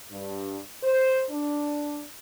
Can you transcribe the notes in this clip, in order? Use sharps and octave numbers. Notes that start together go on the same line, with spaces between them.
G2
C5
D4